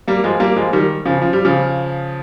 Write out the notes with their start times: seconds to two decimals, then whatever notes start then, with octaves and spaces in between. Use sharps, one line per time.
0.08 G3 A#3
0.24 F3 G#3
0.40 G3 A#3
0.56 F3 G#3
0.73 D#3 G3
1.05 C#3 F3
1.22 F3
1.33 G3
1.45 C#3 F3